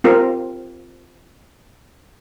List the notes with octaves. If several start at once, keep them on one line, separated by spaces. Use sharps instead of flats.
C4 F4 A#4